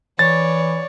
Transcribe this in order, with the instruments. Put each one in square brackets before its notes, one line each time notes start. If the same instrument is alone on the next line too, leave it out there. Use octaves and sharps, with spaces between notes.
[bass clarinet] E3 [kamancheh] C#5 D5 [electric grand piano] A6